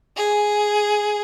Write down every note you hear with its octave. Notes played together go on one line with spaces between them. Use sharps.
G#4